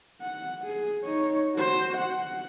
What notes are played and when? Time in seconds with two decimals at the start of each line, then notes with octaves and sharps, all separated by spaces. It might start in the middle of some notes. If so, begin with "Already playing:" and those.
0.21 F#5
0.65 G#4
1.04 D#4 C#5
1.56 F#4 C5
1.98 F#5